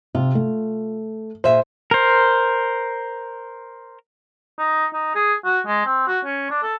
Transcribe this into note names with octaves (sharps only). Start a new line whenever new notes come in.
C3 F4
A3
A#2 G#4 C5 E5
A#4 C5
D#4
D#4
G#4
F#4
G#3
C4
F#4
C#4
D4
A4